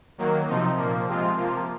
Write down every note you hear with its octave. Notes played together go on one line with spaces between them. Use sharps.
D#3 F#3 A#3
C3 F3 C4 D#4
A#2 F3 A#3
C3 F3 G#3 C4 F4
C3 F3 A#3 F4